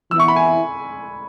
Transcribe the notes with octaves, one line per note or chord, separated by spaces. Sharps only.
E3 B3 E4 E6
C#6
B5
G#5